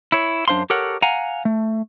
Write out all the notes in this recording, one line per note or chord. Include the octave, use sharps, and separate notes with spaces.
E4 C#5
F#2 D4 C5 F5 C6
G4 A4 A#4 C#5 F#5
F5 F#5 G#5 A#5
A3